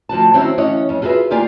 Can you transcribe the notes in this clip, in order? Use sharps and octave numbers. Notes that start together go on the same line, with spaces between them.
D2 F3 F#4 A5
D#3 F#3 C4 C#4 E4 F#4
D2 E3 C#4 C#5 D#5 F#5
F2 C#4
F4 F#4 G#4 A4 B4 E5
D2 A#3 F4 G4 D5 G#5